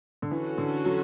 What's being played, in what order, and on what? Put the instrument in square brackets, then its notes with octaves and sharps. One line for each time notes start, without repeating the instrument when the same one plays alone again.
[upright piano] D3
[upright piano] E3 [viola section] C#4 F#4 A4
[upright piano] D3
F#3